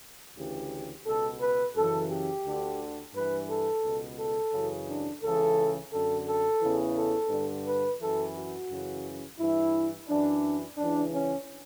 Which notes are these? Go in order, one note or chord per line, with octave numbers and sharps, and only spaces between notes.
D2 C#3 E3 G4
C#2 B2 A4
B4
F#2 C#3 E3 A4
G4
D2 D3
G2 E3 B4
A4
C#2 B2
A4
F#2 C#3 E3
D4
C#2 C#3 E3 A4
F#2 D3 A4
A4
E2 C#3 E3
A4
G2 D3
B4
F#2 E3 A4
F#4
F#2 C#3 E3
G2 E3 E4
F#2 E3 D4
C#2 C#3 E3 D4
C#4